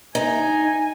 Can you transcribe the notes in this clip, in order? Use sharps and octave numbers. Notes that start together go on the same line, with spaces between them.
D#4 G#5